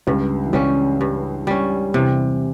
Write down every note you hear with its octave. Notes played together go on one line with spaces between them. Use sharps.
C#2 G2 C#3
E3
C#2 C#3 G3 C#4
G2
G3 C#4
E2 C3 E3